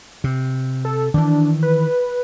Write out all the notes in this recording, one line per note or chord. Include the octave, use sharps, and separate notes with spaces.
C3
A4
D#3 E3 D4
B4